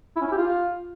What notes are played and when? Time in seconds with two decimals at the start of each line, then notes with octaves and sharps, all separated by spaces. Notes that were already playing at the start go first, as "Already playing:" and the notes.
0.16 E4
0.21 C#4
0.27 E4
0.32 G4
0.37 F4